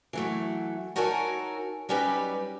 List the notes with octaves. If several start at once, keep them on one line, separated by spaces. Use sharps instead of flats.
E3 F#3 A3
D#4 F#4 A4 A#4 C#5 G#5
F#3 G3 C#4 D#4 G4 B4